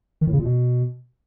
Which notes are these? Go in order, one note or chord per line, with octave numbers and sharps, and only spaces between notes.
D#3
A2
C#3
A#2
B2